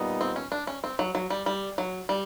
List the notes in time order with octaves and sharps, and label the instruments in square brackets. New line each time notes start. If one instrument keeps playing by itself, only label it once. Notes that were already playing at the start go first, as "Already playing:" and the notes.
Already playing: [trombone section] A#2 G3 B3 D#4
[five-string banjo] C4
C#4
D4
C#4
C4
F#3
F#3
G3
G3
F#3
G3